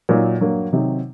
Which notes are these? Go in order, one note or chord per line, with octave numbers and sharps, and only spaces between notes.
A#2 F#3 A#3 D#4
G2 F#3 A#3
C3 D#3 F#3 C4 D#4